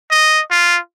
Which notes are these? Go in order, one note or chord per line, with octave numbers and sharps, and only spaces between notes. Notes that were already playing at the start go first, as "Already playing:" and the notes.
D#5
F4